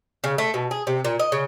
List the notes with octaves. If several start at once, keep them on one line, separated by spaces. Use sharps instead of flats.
C#3
A3
B2
G#4
C3
A#2
D#5
C#3